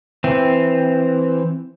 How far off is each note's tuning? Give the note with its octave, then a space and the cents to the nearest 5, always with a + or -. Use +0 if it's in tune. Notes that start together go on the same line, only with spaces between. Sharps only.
E3 +0 C4 +0